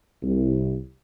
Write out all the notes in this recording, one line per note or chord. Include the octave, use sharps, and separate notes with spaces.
C2